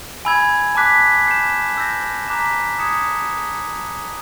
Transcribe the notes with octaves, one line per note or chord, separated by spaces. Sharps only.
G#5 B5 E6 G#6
A5 D6 F#6 B6
G6 C7 E7
E6 G6 A#6
A#5 D6 F#6 B6 E7
D#6 G#6 C#7 E7